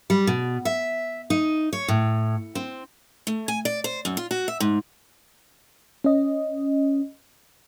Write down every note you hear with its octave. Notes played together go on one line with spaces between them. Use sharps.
G3
B2
E5
D#4
C#5
A2
C4
A3
G#5
D5
C5
F#2
F4
F#4
E5
G#2
C#4 D#5